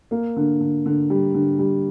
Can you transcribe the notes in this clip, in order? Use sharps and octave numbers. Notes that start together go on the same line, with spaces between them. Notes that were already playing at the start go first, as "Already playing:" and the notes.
A#3
D3
D3
D3
G3
D3
G3